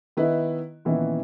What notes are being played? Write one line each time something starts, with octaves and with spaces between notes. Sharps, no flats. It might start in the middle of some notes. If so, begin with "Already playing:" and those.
D#3 B3 E4 B4 D#5
A#2 D#3 E3 B3 C#4 E4